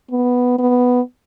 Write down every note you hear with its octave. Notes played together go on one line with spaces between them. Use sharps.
B3
B3